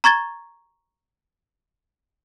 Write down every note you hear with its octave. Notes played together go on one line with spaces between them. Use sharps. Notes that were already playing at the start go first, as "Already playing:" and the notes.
A#5 C#6 G#6 A6 G7